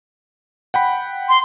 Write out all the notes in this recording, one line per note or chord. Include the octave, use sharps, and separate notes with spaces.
F#5 G5 B5
C6